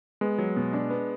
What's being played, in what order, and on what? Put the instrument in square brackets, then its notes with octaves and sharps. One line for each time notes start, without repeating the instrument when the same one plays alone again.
[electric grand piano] G#3 [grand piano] B3
[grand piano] F#3
B2
D4
B3